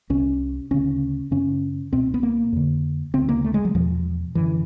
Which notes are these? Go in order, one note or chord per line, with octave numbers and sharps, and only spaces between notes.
C2 C3 C#4
D2 C#3 C#4
F#2 C#3 C#4
C#2 B2 C4
B3
A#3
F2 D3
D2 C#3 C4
A#3
A3
G#3
F#3
E2 B2 F3
F#2 D3 E3